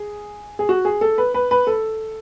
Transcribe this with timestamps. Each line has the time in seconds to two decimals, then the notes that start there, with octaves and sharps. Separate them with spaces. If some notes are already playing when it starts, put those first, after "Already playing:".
Already playing: G#4
0.59 G#4
0.69 F#4
0.85 G#4
1.01 A4
1.18 B4
1.34 B4
1.51 B4
1.67 A4